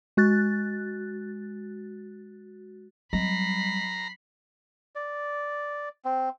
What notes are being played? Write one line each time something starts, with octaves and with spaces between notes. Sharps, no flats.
G#3 F#4 F#6 A6
F#3 G3 A#5 B5 C7
D5
C4